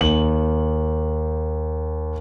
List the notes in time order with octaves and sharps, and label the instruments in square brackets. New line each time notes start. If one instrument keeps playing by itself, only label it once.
[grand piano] D#2 F#7